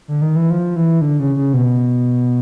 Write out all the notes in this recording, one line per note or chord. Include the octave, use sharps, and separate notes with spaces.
D3
D#3
E3
F3
E3
D3
C#3
C#3
B2